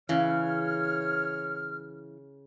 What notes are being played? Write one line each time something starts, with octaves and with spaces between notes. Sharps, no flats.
C#3 E3 C#5 F6